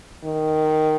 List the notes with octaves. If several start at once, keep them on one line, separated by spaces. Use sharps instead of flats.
D#3